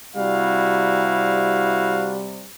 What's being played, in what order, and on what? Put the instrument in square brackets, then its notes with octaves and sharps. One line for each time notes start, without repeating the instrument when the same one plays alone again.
[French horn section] C3 G3 [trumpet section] E4 F#4 F5